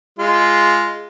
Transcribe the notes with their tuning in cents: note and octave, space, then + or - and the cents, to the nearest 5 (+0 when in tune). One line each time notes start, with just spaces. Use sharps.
G#3 +0 F4 -10